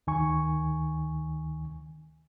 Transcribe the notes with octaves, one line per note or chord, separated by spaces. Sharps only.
D2 D#3 G#5 C#6